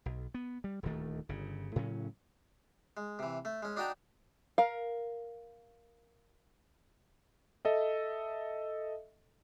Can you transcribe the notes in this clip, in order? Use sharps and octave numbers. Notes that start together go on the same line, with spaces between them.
B1
B3
G3
D#1 D2 D#3 A3
G1 C#3
A2 C#3 F#3 C#4
G#3
C3 E3
A3
G#3 C#4
D4 D#4 F#4 G5 A5 A#5
A#4 F5
A4 D#5 E5